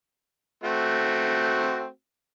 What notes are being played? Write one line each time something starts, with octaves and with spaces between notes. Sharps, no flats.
A3 C4 F#4